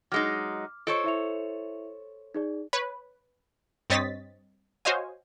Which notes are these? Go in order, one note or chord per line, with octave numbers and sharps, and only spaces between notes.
F#3 G#3 D#4 D6 F6
F4 A4 C5 C#5 D#5 D7
E4 E5 F7
D#4 G#4 D5
B4 C#5
G2 C4 C#5 D#5 A6 B6
F#4 C5 C#5 D#5 F5 G#5